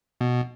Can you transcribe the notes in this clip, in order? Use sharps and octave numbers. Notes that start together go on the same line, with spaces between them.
B2